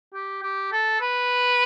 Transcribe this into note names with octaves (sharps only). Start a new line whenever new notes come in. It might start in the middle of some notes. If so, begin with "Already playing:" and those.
G4
G4
A4
B4